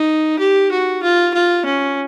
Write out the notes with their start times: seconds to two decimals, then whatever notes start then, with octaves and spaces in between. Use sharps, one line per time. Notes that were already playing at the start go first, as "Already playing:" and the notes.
Already playing: D#4
0.39 G4
0.71 F#4
1.03 F4
1.34 F4
1.65 C#4